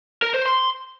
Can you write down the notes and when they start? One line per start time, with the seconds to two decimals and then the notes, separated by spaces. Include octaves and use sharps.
0.22 A#4
0.34 C5
0.46 C6